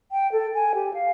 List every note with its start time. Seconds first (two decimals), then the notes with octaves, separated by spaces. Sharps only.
0.12 G5
0.32 A4
0.54 G#5
0.75 G4
0.94 F5